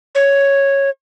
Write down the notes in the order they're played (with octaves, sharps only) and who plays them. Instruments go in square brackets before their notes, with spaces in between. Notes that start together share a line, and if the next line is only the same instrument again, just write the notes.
[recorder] C#5